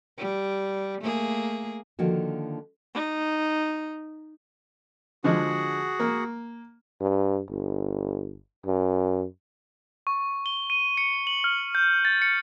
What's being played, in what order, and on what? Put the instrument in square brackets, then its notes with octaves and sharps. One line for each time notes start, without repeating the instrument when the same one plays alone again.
[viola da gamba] G3
A3 A#3 G#4
[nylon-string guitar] D3 D#3 F3 A#3 F#4
[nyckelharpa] D#4
[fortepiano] D3 F3 G#3 [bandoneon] F#4 G#4 F#5
[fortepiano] A#3
[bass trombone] G2
G1
F#2
[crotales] C#6
G7
D#7
C#7
F#7
F6
G6
A6
C#7